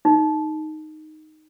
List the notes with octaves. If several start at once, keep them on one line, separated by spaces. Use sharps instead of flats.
D#4